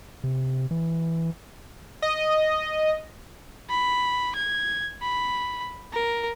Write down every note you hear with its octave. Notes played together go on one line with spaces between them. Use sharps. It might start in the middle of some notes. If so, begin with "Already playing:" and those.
C3
E3
D#5
B5
G#6
B5
A#4